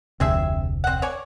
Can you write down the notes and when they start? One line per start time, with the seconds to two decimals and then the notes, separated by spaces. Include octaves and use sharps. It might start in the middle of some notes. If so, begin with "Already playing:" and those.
0.20 F1 D2 C3 C4 G#4 E5
0.84 C4 F#5
1.02 C#5 D5 G#5